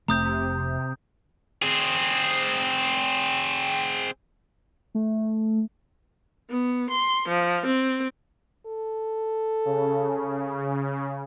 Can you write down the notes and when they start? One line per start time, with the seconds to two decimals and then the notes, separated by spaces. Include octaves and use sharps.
0.08 F1 C3 A3 A#5 D#6 G6
1.62 C4 G#4
4.95 A3
6.49 B3
6.89 C6
7.28 F3
7.66 C4
8.66 A4
9.65 C#3